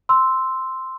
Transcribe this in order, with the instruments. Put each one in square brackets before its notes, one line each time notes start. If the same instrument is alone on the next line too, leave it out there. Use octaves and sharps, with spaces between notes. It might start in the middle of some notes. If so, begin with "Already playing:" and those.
[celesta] C6 E6